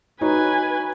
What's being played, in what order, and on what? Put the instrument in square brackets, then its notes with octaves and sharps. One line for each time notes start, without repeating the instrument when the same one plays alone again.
[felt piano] D#4 F#4 C#5 [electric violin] B4 G#5